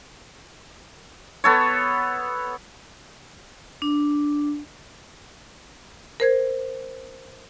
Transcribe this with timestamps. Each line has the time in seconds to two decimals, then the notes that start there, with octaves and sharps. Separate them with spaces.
1.44 B3 A4 C#5
3.82 D4
6.20 A#4 C5 G#6